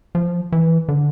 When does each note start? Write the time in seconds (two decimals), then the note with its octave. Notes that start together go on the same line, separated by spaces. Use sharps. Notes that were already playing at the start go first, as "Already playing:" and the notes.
0.15 F3
0.52 E3
0.88 D3